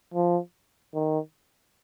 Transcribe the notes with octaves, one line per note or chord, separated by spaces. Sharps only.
F3
D#3